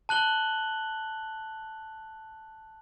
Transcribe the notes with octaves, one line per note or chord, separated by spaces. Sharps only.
A5 F#6 F#7 G7